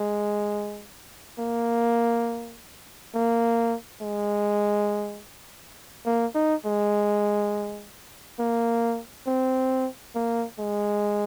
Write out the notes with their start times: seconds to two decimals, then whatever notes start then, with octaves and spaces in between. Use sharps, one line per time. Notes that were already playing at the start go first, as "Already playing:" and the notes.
Already playing: G#3
1.39 A#3
3.15 A#3
4.02 G#3
6.06 A#3
6.35 D#4
6.65 G#3
8.39 A#3
9.27 C4
10.15 A#3
10.59 G#3